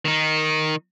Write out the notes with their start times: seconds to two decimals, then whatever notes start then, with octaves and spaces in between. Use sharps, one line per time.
0.05 D#3 D#4